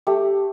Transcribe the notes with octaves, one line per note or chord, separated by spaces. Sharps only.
A3 G4